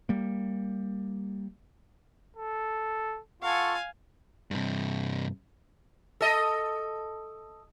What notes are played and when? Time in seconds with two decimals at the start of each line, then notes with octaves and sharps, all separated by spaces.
0.09 G3 A#3
2.36 A4
3.42 F4 A4 F5 F#5 G#5 C#6
4.51 G2 C3
6.21 A4 D#5